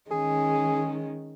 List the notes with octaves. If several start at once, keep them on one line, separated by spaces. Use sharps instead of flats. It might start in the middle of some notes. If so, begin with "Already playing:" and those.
D#3 G#3 C#4 G#4